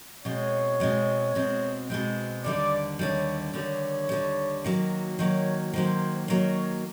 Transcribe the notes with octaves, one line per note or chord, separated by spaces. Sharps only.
B2 G#3 C4 C#5
B2 G#3 C4
B2 G#3 C4
B2 G#3 C4
D#2 D3 G3 D5
D#2 D3 G3 C#5
D#2 D3 G3 C#5
D#2 D3 G3
D#3 F#3 A#3
D#3 F#3 A#3 C#5
D#3 F#3 A#3 C5
D#3 F#3 A#3 C#5